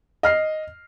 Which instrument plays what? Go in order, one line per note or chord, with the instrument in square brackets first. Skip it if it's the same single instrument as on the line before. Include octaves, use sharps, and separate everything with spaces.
[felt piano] D#5 F6 C7